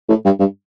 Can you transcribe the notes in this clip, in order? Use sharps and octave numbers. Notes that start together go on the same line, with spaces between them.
A2
G2
G2